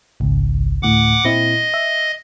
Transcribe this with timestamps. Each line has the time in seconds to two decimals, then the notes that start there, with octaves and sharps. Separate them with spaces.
0.20 G#1 C#2
0.82 D2 A2 F#5 D6
1.25 A#2 C4 E4 D#5
1.74 E5